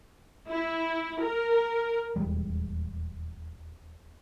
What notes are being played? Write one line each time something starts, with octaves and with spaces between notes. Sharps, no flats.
E4
A#4
D#1 E2 G3 G#3